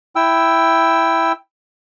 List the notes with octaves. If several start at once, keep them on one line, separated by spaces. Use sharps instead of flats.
E4 G5 E6